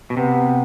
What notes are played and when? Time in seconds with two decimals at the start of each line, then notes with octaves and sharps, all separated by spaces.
0.10 B2
0.17 C3 B3